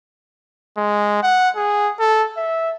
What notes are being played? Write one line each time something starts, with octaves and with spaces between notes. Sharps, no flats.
G#3
F#5
G#4
A4
E5